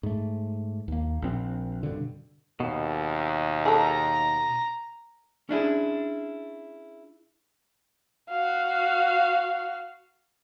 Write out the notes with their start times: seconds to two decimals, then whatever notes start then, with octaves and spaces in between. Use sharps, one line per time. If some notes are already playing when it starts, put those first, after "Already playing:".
0.03 G#2 A3
0.88 D#2 A#3
1.22 A#1 C4
1.83 G2 B2 D3
2.60 D#2 B2
3.66 G#4 A4 A#5
5.49 C#4 D4 E4 G#4
8.30 F#4 F5